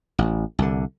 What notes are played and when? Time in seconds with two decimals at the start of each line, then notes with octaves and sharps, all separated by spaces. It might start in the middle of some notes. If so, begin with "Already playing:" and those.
0.19 A1
0.59 C2 D3